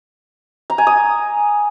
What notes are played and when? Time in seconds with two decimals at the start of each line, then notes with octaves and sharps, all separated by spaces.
0.70 A#5
0.78 G#5
0.87 D#6